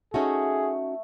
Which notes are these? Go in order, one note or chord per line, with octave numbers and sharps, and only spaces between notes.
A3 C#4 D#4 F#4 G#4